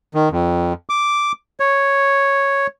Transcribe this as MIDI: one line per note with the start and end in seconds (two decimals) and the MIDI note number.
0.14 0.29 51
0.31 0.73 41
0.90 1.32 86
1.60 2.67 73